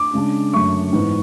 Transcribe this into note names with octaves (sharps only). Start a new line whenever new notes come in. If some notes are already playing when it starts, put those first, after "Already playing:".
Already playing: D6
C#3 G#3 D4
F#2 D3 A3 C#6
G#2 E3 B3